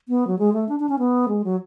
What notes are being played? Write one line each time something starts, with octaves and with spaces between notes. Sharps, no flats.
B3
F#3
G#3
A3
D4
D4
C#4
B3
G#3
F#3